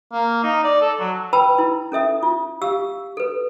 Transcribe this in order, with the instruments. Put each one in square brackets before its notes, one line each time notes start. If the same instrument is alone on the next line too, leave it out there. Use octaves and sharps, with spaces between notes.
[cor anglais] A#3
D#4
D5
A4
F#3
[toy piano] B4 G5 A5 B5 E6
E4
C#4 A4 E5 D#6
F4
G4 F5 E6
A4 B4